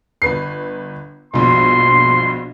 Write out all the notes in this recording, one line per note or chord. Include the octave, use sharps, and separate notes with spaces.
G1 B4 C7
A#1 G2 B2 C6